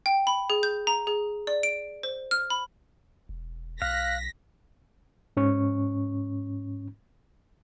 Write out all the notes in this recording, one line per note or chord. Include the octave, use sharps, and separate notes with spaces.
G5
B5
G#4
G6
A#5
G#4
D5
D7
C5
F6
B5
E1
B1 F5 F#6 A#6 B6
G#2 C#4 C#6